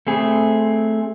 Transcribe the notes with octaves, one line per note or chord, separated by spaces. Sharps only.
A3 C4 G#4